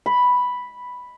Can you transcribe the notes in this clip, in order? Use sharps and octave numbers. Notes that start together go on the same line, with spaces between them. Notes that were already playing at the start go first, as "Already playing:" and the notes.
B5